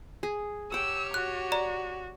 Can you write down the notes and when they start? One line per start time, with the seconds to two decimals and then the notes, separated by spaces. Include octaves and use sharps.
0.23 G#4
0.72 G4 C#5 F#5 G5 E6
1.14 F#4 F#6
1.52 D5 A#5